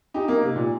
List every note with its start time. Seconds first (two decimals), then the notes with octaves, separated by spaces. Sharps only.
0.14 D#4 G4
0.28 A#3 D#4
0.42 C3
0.56 A#2